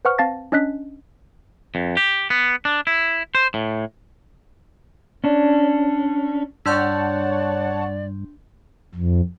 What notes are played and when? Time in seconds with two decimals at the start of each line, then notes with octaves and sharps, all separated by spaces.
0.05 B4 C5 F#5 C#6 F6
0.18 C4 F5 A5 A6 A#6
0.52 C#4 D4 D#5 F#6 B6
1.75 F2
1.97 G4
2.30 B3
2.65 D4
2.87 E4
3.35 C5
3.54 A2
5.24 C#4 D4
6.66 G2 D4 C#5 D5 F#5 A5 C6 G6
8.95 F2